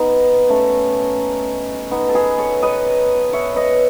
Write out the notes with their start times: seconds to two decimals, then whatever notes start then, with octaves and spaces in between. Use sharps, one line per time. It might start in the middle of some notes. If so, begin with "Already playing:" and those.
Already playing: B3 D#4
0.49 A3 C#4
1.91 B3 D#4
2.09 A4
2.15 G#4 B4
2.38 A4 C#5
2.62 B4 D#5
3.33 C#5 E5
3.56 B4 D#5